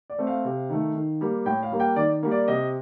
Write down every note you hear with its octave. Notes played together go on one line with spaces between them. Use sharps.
D5
A3 C4
F5
C3
D#3 A3
D#3
G3 A#3
A2 G5
F5
G3 A#3
G5
D#3 D5
G3 A#3
D5
C3 D#5